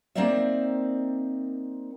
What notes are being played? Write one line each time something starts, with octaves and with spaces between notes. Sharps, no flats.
A#3 C4 D#4 C5 D5 E5